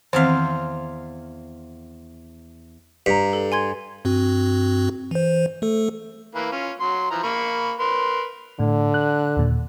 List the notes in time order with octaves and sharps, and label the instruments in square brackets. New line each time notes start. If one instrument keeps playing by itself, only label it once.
[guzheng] E2 C5 F5 [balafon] D#3 C4
[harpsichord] G2 [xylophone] A#5 B6
[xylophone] A4
G#5 C6 G#6
[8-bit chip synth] G2 C4 F#4
E3 C5
A3 A4
[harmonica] E3 A#3 B4
C#4 F4
F#3 C6
E3 F3 A#5
A#3 B5 C#6
A#4 B4 C6
[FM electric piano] A2 [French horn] D3
[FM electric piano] F#6
D#2 A#2